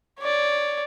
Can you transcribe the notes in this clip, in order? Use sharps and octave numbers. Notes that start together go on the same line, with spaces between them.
C#5 D5